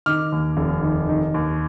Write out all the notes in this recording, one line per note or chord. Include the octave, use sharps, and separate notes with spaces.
D#3 D6 F6
D#2
F1
D#3
D#3
D#2